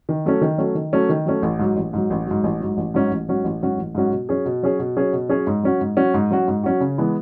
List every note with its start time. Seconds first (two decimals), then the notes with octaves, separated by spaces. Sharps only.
0.09 D#3
0.26 F#3 A3 C#4
0.41 D#3
0.58 F#3 A3 C#4
0.75 D#3
0.93 F#3 A3 C#4
1.09 D#3
1.26 F#3 A3 C#4
1.42 A1
1.59 G#2 F#3
1.76 A1
1.93 G#2 F#3
2.10 A1
2.27 G#2 F#3
2.43 A1
2.60 G#2 F#3
2.77 A1
2.94 G#2 F#3 C#4 F#4
3.12 A1
3.28 G#2 F#3 C#4 F#4
3.44 A1
3.62 G#2 F#3 C#4 F#4
3.78 A1
3.95 G#2 F#3 C#4 F#4
4.12 B2
4.29 F#3 C#4 G#4 C#5
4.45 B2
4.63 F#3 C#4 G#4 C#5
4.79 B2
4.96 F#3 C#4 G#4 C#5
5.13 B2
5.29 F#3 C#4 G#4 C#5
5.47 G#2
5.63 F#3 C#4 F#4
5.81 G#2
5.97 F#3 C#4 F#4
6.14 G#2
6.31 F#3 C#4 F#4
6.48 G#2
6.64 F#3 C#4 F#4
6.81 C#3
6.98 E3 G#3 B3